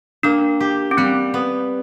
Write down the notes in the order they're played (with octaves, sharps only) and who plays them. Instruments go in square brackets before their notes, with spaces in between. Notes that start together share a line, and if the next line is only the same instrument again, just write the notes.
[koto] A#3 [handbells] D4
[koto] G4
[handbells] C#4
[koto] G3 [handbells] C4
[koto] B3